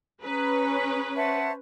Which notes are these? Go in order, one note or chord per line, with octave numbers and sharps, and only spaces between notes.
C#4 G#4 B4 A#5
C5 C#5 E5 F#5 A5